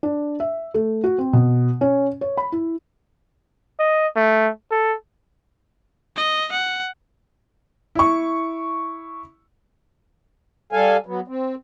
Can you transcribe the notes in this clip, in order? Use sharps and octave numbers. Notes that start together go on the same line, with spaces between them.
D4
E5
A3
F#4
C4
B2
C#4
C#5
B5
E4
D#5
A3
A4
D#5
F#5
E4 C#6
G3 A4 F5 G#5
F#3 B3
C4